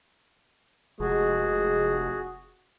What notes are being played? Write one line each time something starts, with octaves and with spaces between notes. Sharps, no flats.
F1 G#3 F#4 G#4